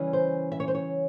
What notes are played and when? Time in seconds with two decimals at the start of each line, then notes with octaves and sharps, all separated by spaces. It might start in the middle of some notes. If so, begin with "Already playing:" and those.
Already playing: C#3 E3 G3 C#4
0.13 C5
0.52 E5
0.60 C#5
0.68 C5
0.75 C#5